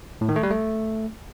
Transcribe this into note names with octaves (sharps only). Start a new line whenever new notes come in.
A2
D#3
A3
G3
A3